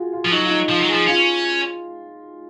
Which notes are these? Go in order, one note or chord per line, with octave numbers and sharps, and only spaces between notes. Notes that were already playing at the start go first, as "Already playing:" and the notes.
Already playing: F4 F#4 G#4
F4
F3
F#3 D#4
F4
D#4
F3 F4
F#3
F3 G#4
C#4 F4